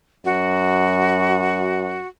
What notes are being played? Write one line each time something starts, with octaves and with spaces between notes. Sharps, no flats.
F#2 F#4